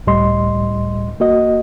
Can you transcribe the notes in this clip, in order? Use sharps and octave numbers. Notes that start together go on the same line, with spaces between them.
C#2 A2 G3 D#5 C6
A#3 F#4 D#5